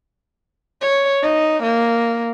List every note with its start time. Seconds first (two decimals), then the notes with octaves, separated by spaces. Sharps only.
0.82 C#5
1.23 D#4
1.63 A#3